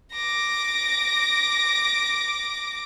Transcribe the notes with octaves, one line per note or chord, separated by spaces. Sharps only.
D6 A#6